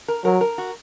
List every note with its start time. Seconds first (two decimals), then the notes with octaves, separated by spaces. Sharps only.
0.08 A#4
0.24 F#3 A#4
0.41 A#4
0.58 F#4